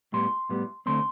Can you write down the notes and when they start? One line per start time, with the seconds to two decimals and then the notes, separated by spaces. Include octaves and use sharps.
0.13 A2 G3 B3 C6
0.50 A2 G3 B3
0.86 D3 A3 C4 C6